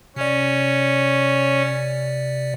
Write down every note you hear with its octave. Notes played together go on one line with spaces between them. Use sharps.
C3 C#4 D5